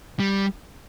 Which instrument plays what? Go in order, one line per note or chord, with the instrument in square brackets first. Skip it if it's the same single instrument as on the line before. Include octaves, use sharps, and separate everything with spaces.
[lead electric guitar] G3